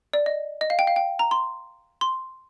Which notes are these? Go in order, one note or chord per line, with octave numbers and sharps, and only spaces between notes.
D5
D#5
D#5
F5
G5
F5
G5
A#5
C6
C6